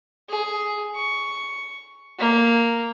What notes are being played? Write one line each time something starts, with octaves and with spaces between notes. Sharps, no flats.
G#4
C#6
A#3